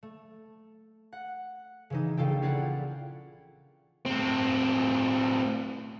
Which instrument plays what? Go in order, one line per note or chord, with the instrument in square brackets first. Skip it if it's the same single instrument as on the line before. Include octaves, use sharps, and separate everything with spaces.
[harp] A3
F#5
C#3 E3 D#4
A#1 C#3 F4 A4 G5
C#4 E4 F4 D5 F#5 G5
[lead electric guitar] A2 C4